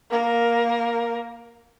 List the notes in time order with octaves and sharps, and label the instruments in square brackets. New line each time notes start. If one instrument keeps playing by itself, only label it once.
[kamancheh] A#3 A#4